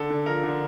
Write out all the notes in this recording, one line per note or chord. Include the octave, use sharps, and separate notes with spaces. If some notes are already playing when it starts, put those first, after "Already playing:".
Already playing: D3 A4
D3
F3 A#4
D3